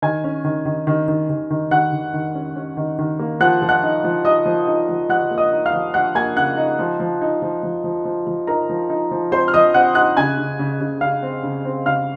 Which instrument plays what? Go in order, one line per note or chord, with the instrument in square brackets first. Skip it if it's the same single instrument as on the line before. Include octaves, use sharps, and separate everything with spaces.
[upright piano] D#3 G#5 G#6
C#4
D#3
D#3
D#3
D#3
D#3
D#3
D#3 F#5 F#6
D#3
D#3
C#4
C#4
D#3
D#3
A#3
F3 F#5 F#6
F3
F#5 F#6
D#4
F3
D#4 D#5 D#6
F3
D#4
F3
F3 F#5 F#6
A#3
D#5 D#6
D#4
F5 F6
F3
F3 F#5 F#6
A#3 G#5 G#6
C#3 F#5 F#6
D#4
F3
F3
D#4
F3
F3
F3
F3
F3
D#4 A#4 A#5
F3
D#4
F3
C4 C5 C6
F6
F3 D#5 D#6
C4 F#5 F#6
D#4 F#5 F#6
C#3 G#5 G#6
C#3
C#3
C#3
C#3 F5 F6
C4
C#3
C4
C#3 F5 F6